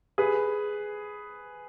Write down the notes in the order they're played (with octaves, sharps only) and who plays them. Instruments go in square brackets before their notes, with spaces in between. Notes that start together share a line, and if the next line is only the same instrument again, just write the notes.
[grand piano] G#4 B4